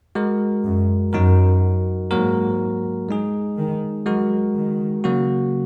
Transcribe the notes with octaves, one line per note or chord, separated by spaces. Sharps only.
G#3 F#4 A#4
F#2
F#2 F#3 D#4 F#4 A#4
G#2 F#3 A#3 F#4 A#4
G#3 D#4 G#4
D#3
F#3 G#3 F#4 A#4
D#3
C#3 F#3 A#3 F#4